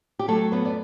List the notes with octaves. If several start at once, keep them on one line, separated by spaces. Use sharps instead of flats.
G4
F#3 A3 A4
F#2 B3 B4
D5